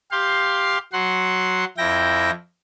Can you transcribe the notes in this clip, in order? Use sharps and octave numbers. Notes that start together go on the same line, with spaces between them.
G4 F5 C6
F#3 F#5 C6
F2 E4 G5 A#6